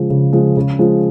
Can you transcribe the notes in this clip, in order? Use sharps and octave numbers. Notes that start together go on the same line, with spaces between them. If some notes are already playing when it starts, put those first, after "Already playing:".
Already playing: C#3 F3 G#3
C#3
F3 G#3
C#3
F3 G#3